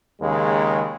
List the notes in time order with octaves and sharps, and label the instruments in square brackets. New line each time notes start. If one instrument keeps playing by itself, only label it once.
[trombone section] D#2 C#3 G#3